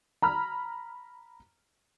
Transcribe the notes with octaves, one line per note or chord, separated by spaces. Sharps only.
A#5 B5 F6